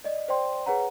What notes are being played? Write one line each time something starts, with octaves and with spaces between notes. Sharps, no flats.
D5 D#5
C5 D5 G5 C6
G#4 B4 C#5 F#5 A#5